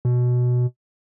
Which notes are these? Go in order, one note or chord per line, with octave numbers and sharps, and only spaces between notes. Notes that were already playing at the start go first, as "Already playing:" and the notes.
B2